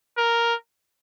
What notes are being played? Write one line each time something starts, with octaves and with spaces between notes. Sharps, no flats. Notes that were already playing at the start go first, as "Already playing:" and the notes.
A#4